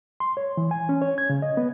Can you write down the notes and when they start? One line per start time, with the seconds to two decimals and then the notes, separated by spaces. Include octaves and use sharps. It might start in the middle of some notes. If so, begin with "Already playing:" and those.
0.20 C6
0.37 C#5
0.57 E3
0.71 G#5
0.89 C#4
1.02 C#5
1.18 G#6
1.30 C#3
1.42 D#5
1.57 B3